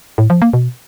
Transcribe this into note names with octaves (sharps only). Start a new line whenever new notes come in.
A2
F3
A#3
B2